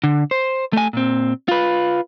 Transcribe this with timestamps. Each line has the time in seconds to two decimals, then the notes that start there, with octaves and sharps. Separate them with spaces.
0.04 D3
0.31 C5
0.73 A3 G#5
0.93 A#2 C4
1.48 F4 B4